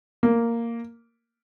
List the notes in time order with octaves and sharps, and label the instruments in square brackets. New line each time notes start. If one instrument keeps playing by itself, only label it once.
[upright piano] A#3